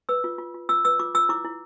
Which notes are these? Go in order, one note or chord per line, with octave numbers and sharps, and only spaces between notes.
B4 E6
F4
F4
F4
F4 E6
B4 E6
F4 D6
F4 E6
E4 D6
E4